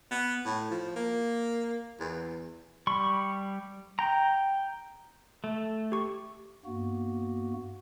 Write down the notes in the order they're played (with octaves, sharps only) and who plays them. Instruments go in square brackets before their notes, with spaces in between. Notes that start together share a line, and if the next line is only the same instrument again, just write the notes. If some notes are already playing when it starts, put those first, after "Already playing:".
[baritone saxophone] B3
A2
F3
A#3
E2
[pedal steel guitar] G3 B5 C#6
G5 A#5
A3
[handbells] G4 C#6
[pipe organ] G2 A#3 B3 F#4